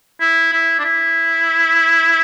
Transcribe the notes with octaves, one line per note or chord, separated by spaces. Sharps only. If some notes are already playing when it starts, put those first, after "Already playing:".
E4
E4
D4
E4